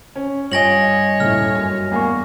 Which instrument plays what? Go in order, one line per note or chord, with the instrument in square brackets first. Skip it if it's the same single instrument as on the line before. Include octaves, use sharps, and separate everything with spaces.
[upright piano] C#4
[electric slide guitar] G2 D#5 [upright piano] F4 [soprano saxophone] C#5 [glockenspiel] G#5 A#6 F#7
[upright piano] D#1 E4 [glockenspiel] F6
[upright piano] F#2 G#5
[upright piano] E2 G#5 C#6 [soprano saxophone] A#3